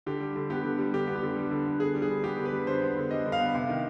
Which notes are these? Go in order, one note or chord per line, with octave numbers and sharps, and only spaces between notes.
D3 G4
G3
D3
B3 G4
D3
G3
D3 G4
B3
G4
D3
G3
D3
B3
D3 G#4
G3
G#4
D3
B3 G4
D3
B4
G3
D3 C5
B3
D3
G3 D#5
D3
F5
B3
C3
D#3